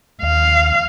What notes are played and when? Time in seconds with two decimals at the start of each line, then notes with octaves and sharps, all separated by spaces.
0.22 D#2 F5